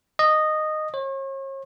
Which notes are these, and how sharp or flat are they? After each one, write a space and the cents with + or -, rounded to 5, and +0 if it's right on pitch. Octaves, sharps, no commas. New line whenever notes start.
D#5 -10
C#5 -40